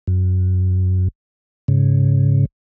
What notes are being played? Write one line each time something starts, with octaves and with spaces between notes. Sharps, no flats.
F#2
G#2 C#3